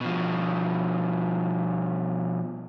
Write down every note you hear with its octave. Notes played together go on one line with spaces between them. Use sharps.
B2 F3